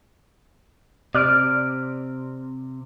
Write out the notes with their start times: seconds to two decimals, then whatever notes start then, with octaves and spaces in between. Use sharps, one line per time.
1.15 C3 D5 F6 D7